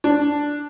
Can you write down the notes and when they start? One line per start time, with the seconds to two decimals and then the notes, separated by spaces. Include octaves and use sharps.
0.04 D4